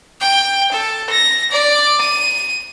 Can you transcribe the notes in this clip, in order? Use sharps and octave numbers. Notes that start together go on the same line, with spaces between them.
G5
A4
A#6
D5
D#7